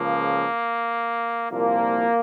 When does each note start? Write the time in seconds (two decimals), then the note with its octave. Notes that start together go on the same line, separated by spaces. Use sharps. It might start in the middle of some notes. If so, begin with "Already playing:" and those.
Already playing: C#2 C#3 F3 A#3
1.51 C2 A#2 F3 A#3